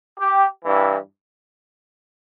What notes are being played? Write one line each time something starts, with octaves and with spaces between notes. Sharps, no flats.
G4
G2 E3